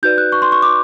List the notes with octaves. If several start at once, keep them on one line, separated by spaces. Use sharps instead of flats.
D#4 F#4 B4 D5 G6
F#6
C#6
C6
C#6
D6